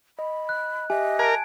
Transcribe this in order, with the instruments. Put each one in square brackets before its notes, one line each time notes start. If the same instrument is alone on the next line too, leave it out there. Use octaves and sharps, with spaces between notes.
[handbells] D#5 [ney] B5
[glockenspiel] F#6
[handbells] G4 E5 [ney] D#5 [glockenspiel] G#5
[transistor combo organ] A#4 [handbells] A5 [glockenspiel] G#6 D7